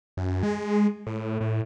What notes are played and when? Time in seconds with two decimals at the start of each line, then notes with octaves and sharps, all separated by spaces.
0.17 F#2
0.43 G#3
1.07 A2
1.41 A2